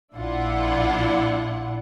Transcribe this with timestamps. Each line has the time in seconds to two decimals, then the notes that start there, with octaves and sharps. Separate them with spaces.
0.14 A#1 D4 E4 F4 F#5